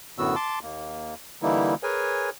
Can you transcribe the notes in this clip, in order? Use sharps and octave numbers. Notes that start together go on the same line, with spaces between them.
F#2 A2 D3 B3 F#4 E6
A5 C6 D6
D#2 A#3
D3 E3 G3 A#3 D#4 E4
G#4 A#4 B4 C#5 G#5